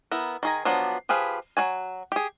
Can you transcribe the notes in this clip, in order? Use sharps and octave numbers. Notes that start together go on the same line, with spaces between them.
B3 E4 A#4
D#3 G#4 A#5
F3 F#3 B3 D4
F3 G4 G#4 B4 F5
F#3 D#4 F#4 G#5
G4 G#4